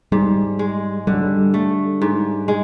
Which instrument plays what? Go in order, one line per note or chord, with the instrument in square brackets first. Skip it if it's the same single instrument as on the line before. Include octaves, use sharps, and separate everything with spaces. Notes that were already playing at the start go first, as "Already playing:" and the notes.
[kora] G#2 [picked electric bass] G3
[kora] G#3
[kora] D3 [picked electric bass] G3
[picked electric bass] F#3
G3
[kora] A3
G#2
G#3